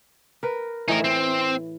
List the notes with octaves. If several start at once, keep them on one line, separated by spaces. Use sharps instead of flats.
A#4 B4
A2 E3 D#4 A#4
C4